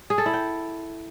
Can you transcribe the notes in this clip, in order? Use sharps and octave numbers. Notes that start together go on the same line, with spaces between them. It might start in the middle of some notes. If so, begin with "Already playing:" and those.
G#4
A4
E4
G5